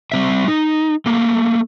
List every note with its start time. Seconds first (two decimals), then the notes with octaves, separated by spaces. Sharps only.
0.12 G3 C4 E5
0.48 D#4
1.06 A3 A#3